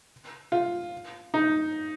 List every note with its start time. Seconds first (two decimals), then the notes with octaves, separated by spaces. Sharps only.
0.52 F4
1.34 D#4